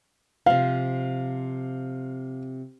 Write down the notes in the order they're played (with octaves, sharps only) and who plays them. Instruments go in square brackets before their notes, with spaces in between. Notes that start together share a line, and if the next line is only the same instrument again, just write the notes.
[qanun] C3 F3 [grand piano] F5